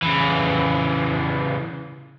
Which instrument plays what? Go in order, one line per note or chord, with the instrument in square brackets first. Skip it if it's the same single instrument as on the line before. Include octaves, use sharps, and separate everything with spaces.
[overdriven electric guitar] C#3 E3